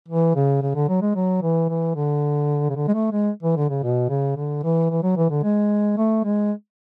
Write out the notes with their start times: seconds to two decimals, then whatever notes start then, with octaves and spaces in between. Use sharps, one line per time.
0.08 E3
0.35 C#3
0.62 C#3
0.75 D3
0.88 F#3
1.02 G#3
1.15 F#3
1.42 E3
1.69 E3
1.95 D3
2.70 C#3
2.76 D3
2.88 G#3
2.94 A3
3.12 G#3
3.43 E3
3.56 D3
3.70 C#3
3.83 B2
4.09 C#3
4.37 D3
4.63 E3
4.90 E3
5.03 F#3
5.17 E3
5.30 D3
5.43 G#3
5.98 A3
6.24 G#3